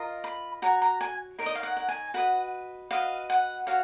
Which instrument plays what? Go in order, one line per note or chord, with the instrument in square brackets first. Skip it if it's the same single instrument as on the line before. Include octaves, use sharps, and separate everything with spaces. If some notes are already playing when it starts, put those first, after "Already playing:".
Already playing: [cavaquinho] F4 A#4 D#5
B5
F#4 C#5 A#5
A#5
G#5
D#4 A#4 C#5
D#5
F5
F#5
F#5
G#5
F#4 B4 D#5 F#5
F#4 B4 D#5 F5
F#5
F#4 C#5 F5